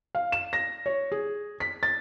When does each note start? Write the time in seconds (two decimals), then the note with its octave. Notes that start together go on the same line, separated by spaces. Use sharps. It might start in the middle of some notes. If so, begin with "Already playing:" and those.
0.15 F5
0.32 E7
0.53 A#6
0.86 C#5
1.12 G#4
1.60 B6
1.83 A6